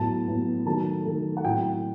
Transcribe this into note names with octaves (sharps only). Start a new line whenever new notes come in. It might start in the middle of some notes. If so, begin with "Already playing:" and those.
Already playing: A2 F#3 B3 A5
A2 F#3 B3
D#3 F#3 A3 A5
D#3 F#3 A3
F#5
A2 F#3 C4 G5